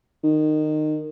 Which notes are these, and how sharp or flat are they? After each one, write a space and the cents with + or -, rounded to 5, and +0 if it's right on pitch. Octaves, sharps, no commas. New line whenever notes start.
D#3 -20